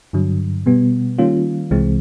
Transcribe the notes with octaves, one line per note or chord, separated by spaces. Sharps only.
G2 D3 F#3
B2 G3 B3
D#3 G3 A#3 C#4 F4
C2 C3 E3 G#3 C4